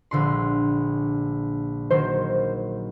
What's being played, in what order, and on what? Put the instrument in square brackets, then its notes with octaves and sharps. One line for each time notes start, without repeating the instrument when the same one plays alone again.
[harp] A#1 D3 C6
[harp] D#3 F#3 [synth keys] C5